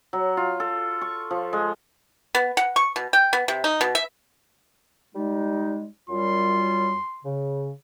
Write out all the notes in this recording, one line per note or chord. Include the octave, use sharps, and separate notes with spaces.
F#3
F4
A4
C#6
F3
G#3
B3
F#5
C#6
B2
G5
B3
C3
D#4
B2
E5
G3 G#3 D#4
F#2 G3 F4 C6
C#3